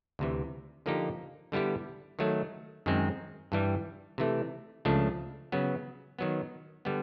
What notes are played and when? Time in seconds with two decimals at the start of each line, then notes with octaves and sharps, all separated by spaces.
0.19 D2 C3 E3
0.86 D3 F3 A#3 D#4 G4
1.52 D3 G3 B3 E4 G4
2.19 D#3 F#3 A3
2.86 F#2 D#3 G#3 C4
3.52 G2 E3 G3
4.18 C3 E3 A3
4.85 C#2 C#3 F3 A3 D4
5.52 C#3 F#3 B3
6.19 D#3 F#3 B3
6.85 D3 G3 B3